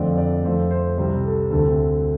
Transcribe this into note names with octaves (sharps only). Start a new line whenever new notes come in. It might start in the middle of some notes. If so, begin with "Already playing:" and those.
Already playing: F2 D3 F3 A3 C4 D5
D5
F2 F3 A3 C5
C5
C2 C3 G3 C4 C5
A4
D2 D3 A3 C4 A4